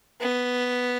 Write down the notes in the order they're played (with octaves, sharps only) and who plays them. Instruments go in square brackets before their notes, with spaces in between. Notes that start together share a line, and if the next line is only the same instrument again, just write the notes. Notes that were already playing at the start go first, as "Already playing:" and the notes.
[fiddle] B3